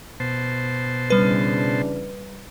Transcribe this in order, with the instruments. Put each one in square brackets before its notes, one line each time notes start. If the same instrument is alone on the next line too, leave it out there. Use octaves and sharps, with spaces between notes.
[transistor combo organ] B2 C5 A5
[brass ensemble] C#3 E3 D4 [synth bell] G3 B4